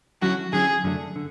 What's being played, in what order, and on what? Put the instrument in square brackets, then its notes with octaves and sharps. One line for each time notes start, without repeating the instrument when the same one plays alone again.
[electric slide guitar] D3 F#3 C#4 E4 [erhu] F#4
[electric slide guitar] D3 F#3 C#4 E4 [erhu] G#4
[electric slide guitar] F#2 D3 F#3 A3 D4
D3